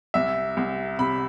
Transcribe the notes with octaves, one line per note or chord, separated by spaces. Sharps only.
C2 E5
C2
C3 B5